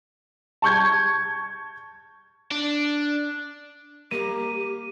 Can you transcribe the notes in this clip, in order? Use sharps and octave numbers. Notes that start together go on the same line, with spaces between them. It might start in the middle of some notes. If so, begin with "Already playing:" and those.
A5 C#6 G6 G#6
D4
A#3 G4 D#7